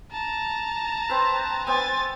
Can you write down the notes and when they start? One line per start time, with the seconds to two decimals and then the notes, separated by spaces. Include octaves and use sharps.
0.12 A5 A#5
1.10 C4 B4
1.67 B3 C4 G#5 A6